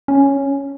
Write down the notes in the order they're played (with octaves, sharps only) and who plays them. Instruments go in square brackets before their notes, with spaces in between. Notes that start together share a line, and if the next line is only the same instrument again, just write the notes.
[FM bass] C#4